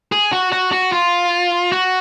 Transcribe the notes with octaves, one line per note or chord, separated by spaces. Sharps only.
G#4
F#4
F#4
F#4
F4
F#4